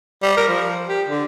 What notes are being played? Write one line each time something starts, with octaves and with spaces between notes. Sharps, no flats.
G3
A#4
F3
G4
D3